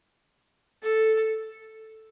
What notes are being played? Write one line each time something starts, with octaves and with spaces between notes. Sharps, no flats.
A4